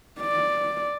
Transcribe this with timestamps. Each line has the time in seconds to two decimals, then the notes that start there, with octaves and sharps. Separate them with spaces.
0.21 D5